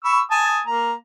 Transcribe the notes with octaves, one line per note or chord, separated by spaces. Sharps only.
B5 C#6 E6
G#5 A5 D#6
A#3 A#5